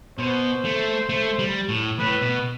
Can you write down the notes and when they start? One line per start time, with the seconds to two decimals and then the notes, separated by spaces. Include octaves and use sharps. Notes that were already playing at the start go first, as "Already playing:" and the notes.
0.19 B2 C5
0.65 A3
1.09 A3
1.39 G3
1.69 A2
1.99 A2 B4
2.22 B2